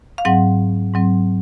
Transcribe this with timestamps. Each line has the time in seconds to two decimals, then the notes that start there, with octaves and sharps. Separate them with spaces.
0.18 F5
0.25 G#2 F#3 C4 F#5
0.94 G#2 F#3 C4